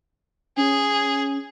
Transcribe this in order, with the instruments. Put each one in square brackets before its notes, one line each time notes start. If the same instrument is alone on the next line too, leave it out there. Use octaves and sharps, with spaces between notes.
[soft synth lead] C#4 [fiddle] G#4